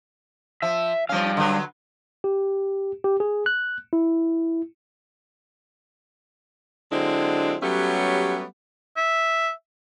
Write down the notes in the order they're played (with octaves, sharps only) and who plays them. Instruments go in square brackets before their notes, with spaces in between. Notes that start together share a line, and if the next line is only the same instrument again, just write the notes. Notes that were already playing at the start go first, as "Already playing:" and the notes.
[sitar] F3 [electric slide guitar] E5
[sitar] F3 C#4 [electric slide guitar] G3 F5
[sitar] D3 F#3 B4
[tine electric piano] G4
G4
G#4
F#6
E4
[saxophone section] D3 F#3 G#3 C4 D4 E4
F#3 G3 A3 B3 C#4 G4
[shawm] E5